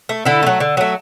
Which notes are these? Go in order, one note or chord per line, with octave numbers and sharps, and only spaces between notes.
A3
D3 E4 A4
F#3 A3
D3
F#3 A3